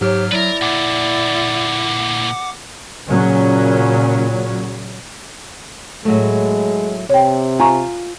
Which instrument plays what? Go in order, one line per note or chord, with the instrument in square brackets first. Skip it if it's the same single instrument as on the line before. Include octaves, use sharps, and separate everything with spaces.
[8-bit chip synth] G#2 F#3 F6 [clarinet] G4 [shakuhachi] C#5
[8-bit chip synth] F#3 [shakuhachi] E4 [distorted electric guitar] A#4 B4 [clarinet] D5
[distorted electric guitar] A#2 D3 [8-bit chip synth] F#5 D6
[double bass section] A#2 C#3 F#3 C#4
[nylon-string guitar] A2 F#3 A3 [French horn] G#3
[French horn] C3 [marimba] C#5 G5
[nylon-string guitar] F4 [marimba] G#5 A#5 C#6